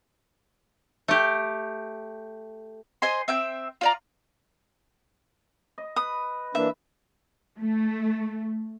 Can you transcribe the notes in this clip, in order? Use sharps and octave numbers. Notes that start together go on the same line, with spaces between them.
A3 G4
C5 D#5 G#5 C6
C4 E5 G5 G6
F4 D5 A#5
D#5
B4 D#6
E3 A#3 D4 E5
A3